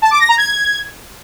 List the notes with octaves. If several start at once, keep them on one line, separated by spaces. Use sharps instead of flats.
A5
D6
A#6
A#5
G#6